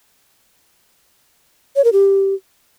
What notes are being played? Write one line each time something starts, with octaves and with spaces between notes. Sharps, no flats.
C#5
A#4
G4